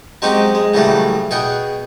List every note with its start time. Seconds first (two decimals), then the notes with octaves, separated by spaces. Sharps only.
0.22 F#3 G#3 C4 C#4 D#4 G4
0.55 G#3
0.74 A2 C#3 E3 F#3 G3 A3
1.31 B2 G#4 F#5 G5